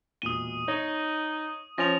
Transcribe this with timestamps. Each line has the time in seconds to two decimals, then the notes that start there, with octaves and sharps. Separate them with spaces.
0.22 E1 A#2 D#6 D#7 G7
0.68 D#4 C#5
1.78 F3 C#4 A#6 F7